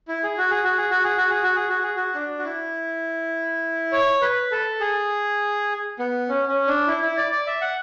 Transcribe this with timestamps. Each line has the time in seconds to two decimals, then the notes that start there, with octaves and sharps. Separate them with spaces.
0.08 E4
0.23 G#4
0.38 F#4
0.51 G#4
0.64 F#4
0.77 G#4
0.91 F#4
1.04 G#4
1.17 F#4
1.30 G#4
1.43 F#4
1.56 G#4
1.69 F#4
1.83 G#4
1.96 F#4
2.15 D4
2.39 F#4
2.45 E4
3.92 C#5
4.22 B4
4.51 A4
4.80 G#4
5.99 B3
6.29 C#4
6.49 C#4
6.68 D4
6.87 E4
7.02 E4
7.17 D5
7.32 D5
7.47 E5
7.62 F#5